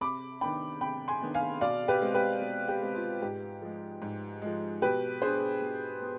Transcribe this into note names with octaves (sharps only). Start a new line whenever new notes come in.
C3 B5 D6
D#3 B3 D4 G5 B5
C3 G5 B5
G#5 C6
D#3 B3 D4
F5 G#5
B2 D5 F5
G4 B4
G#3 C4
G4 B4
B2
G4
G#3 C4
F4
G#2 G4
F3 G#3
G#2
F3 G#3
B2 G4 B4
B3 D4 G#4 C5
B2
B3